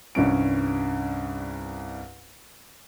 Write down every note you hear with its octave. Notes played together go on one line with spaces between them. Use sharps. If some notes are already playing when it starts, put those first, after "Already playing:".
C2 G2 C#4 D7